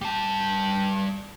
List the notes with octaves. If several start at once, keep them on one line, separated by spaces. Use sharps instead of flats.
G3 A5